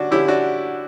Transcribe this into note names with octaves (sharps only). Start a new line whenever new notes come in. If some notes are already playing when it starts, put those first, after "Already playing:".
Already playing: D3 G3 C#4 D4 F#4
D3 G3 C#4 E4 G4
D4 F#4